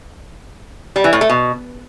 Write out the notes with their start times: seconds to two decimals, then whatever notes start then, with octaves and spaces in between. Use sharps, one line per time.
0.96 G3
1.04 E3
1.13 A2
1.21 A3
1.30 B2